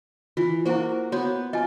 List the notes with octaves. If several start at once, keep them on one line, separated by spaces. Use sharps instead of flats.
E3 F4
A#3 E4 F#4 C5
B3 F#4 C#5
F4 D#5 G#5